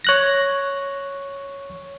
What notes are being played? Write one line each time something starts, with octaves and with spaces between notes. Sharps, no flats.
C#5 F#6 A#6